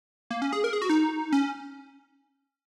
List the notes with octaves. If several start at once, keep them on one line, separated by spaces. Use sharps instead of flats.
A#3
C#4
G#4
A#4
G#4
F#4
D#4
C#4